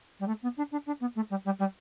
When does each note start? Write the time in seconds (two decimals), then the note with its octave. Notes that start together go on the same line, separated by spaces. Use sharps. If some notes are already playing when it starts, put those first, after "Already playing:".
0.20 G3
0.27 A3
0.42 B3
0.57 D4
0.72 D4
0.87 D4
1.01 B3
1.16 A3
1.30 G3
1.45 G3
1.59 G3